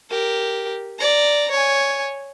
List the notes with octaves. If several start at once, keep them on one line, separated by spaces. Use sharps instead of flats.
G4 A#4
D5 A#5
C#5 G#5